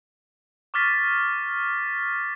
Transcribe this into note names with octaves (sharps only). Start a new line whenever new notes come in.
C#6 D6 F6 A6 B6